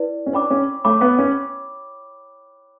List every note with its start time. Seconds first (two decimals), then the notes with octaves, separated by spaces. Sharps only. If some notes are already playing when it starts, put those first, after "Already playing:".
Already playing: E4 B4 D5
0.26 C#4
0.33 D4 C#5 G5 B5 D6
0.51 C#4
0.85 A3 C#5 G5 B5 D6
1.01 B3
1.19 C#4